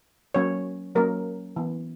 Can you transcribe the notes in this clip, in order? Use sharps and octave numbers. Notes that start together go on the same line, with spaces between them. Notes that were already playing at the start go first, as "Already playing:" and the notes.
F#3 A#3 C#4 C#5
F#3 A#3 C#4 A#4
E3 B3